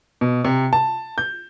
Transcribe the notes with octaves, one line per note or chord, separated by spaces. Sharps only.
B2
C3
A5
G6